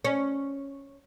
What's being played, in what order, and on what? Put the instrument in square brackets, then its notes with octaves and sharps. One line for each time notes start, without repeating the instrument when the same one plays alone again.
[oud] C#4